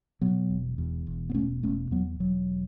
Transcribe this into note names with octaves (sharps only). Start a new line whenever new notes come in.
B2 F#3 B3
E1
E2
E1
B3
B2 A3 C#4
E1 A3 C#4
E2 F#3 B3
E1 F#3